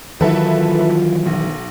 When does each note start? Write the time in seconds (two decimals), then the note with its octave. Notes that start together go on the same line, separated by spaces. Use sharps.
0.21 D#3 E3 F#3 E4 F4 A4 B4
1.26 B1